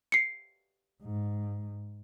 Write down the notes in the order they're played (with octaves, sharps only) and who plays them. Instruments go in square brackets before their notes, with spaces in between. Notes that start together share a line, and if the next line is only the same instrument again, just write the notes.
[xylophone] C7 C#7
[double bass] G#2